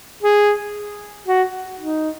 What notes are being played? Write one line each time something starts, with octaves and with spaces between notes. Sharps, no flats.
G#4
F#4
D#4